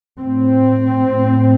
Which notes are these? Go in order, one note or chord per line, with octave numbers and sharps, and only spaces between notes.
A2 C4
A2